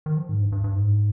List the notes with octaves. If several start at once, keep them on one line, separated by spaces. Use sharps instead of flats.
D#3
F3
G#2
G2
G2
G2
G#2